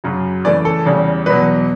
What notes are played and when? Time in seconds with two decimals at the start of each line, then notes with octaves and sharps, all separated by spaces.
0.04 F#2 C#3 F#3
0.45 C#3 E3 A3 D5
0.65 A4
0.85 E2 C#3 G3
1.26 E2 B2 F#3 B4